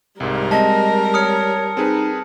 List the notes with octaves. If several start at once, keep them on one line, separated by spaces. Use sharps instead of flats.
C2 G#2 G3 A#4
G#3 C4 D#5 A5
C#5 D#6 F6 C#7
C4 D#4 G#4 B4